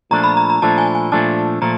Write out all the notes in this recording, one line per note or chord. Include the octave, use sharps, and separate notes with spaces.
A#2 F3 A3 D4 A#5
B5
A#5
A#5
A#2 F3 A3 D4 A5
G#5
G#5
A#2 F3 A3 D4 A5
A#2 F3 A3 A#5